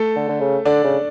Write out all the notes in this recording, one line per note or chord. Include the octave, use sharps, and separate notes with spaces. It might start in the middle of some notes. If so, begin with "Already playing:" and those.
Already playing: A3 A4
D3
D3
C#3
D3 D4 D5
C#3